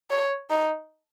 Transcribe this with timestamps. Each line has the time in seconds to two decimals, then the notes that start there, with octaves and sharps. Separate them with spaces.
0.10 C#5
0.51 D#4